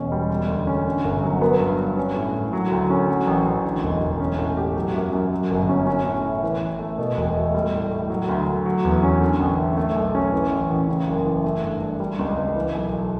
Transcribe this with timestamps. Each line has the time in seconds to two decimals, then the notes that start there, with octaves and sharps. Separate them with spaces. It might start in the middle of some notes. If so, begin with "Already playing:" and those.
Already playing: E1 B2 C#4
0.12 G3
0.30 G3
0.48 D2
0.67 C#4
0.86 D3
1.04 G1
1.23 F#3
1.42 B3
1.60 G2
1.78 G2
1.97 C#4
2.16 A2
2.35 A2
2.53 F#3
2.72 D2
2.90 C#4
3.08 F#3
3.27 A1
3.46 A1
3.64 D3
3.83 E1
4.01 E1
4.20 C#4
4.39 A2
4.57 G4
4.75 F#3
4.94 F#2
5.13 F#2
5.31 F#3
5.51 G1
5.69 C#4
5.87 C#4
6.06 A2
6.25 E4
6.43 E3
6.61 A1
6.80 A3
6.98 B2
7.17 E1
7.35 A3
7.55 G3
7.73 A2
7.91 A2
8.10 F#3
8.29 D2
8.47 D2
8.66 F#3
8.85 E2
9.03 C#4
9.21 D3
9.40 A1
9.58 A3
9.77 A3
9.96 B1
10.15 C#4
10.32 E3
10.52 A1
10.70 A1
10.88 C#3
11.07 F#1
11.25 E3
11.44 A3
11.63 G2
11.82 D4
12.00 G3
12.19 C#2
12.37 C#2
12.55 E3
12.74 B1
12.92 B1